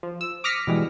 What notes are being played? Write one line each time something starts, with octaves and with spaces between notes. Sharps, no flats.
F3
E6
D6 D#6 F6 A#6 B6 C#7
B2 E3 G3 G#3